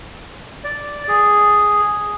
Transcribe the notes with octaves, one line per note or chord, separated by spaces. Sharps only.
D5
G#4